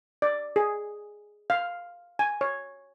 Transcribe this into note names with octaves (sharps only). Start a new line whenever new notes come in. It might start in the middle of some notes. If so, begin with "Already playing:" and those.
D5
G#4
F5
G#5
C#5